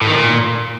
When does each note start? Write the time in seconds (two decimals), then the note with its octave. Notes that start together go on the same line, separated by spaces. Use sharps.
0.02 A2
0.07 D#3
0.13 A#2